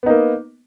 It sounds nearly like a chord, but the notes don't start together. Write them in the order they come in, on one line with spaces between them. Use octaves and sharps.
B3 D#4 A#3